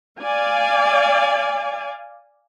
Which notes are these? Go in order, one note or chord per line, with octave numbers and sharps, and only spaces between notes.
D5 F5 G#5